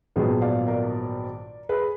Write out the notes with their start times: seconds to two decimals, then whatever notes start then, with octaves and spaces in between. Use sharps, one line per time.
0.16 A#1 G#2 D#3 F#3 B3 G#4
0.42 D5 F5
0.67 A#4 D5
1.69 G#4 B4